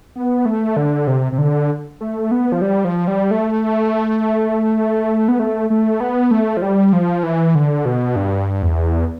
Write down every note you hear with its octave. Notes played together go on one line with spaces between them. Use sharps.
B3
A3
D3
C3
C3
D3
A3
B3
F3
G3
F3
G3
A3
B3
A3
A3
B3
A3
F3
G3
F3
E3
D3
B2
G2
E2